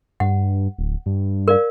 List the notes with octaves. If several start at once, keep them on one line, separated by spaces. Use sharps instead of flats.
G2 F#5
D1
G2
A#4 D5 F5